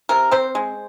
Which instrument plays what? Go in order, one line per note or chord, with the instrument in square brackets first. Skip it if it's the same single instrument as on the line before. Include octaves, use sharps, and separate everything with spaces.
[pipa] C3 A#4
C4 C5
G#3